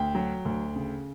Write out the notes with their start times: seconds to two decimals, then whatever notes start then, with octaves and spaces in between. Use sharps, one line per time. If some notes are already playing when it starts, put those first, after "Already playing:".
Already playing: D2 G5
0.15 F#3
0.45 D2
0.76 C#3